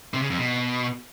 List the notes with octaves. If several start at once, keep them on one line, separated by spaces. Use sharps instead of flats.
C3
C#3
F2
B2